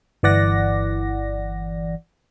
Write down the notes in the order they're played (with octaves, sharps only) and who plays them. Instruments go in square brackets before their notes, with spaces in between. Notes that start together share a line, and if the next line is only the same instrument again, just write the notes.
[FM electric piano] G1 E3 D5 F#5 A#6